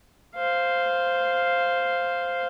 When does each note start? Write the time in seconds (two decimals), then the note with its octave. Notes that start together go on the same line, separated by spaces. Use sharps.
0.35 C5 F5